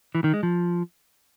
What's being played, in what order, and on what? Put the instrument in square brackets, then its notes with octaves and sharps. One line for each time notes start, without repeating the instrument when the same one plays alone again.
[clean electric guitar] E3
D#3
G#3
F3